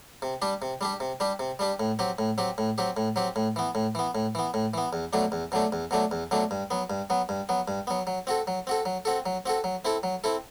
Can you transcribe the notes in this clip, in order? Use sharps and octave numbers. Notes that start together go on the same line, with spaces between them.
C3
G3 D4 G4
C3
G3 D4 G4
C3
G3 D4 G4
C3
G3 D4 G4
A2
F#3 C4 G4
A2
F#3 C4 G4
A2
F#3 C4 G4
A2
F#3 C4 G4
A2
E3 B3
A2
E3 B3
A2
E3 B3
A2
E3 B3
E2
B2 F#3 A3 D4
E2
B2 F#3 A3 D4
E2
B2 F#3 A3 D4
E2
B2 F#3 A3 D4
G2
F#3 B3
G2
F#3 B3
G2
F#3 B3
G2
F#3 B3
F#3
C4 F#4 A4
F#3
C4 F#4 A4
F#3
C4 F#4 A4
F#3
C4 F#4 A4
F#3
C4 E4 A4
F#3
C4 E4 A4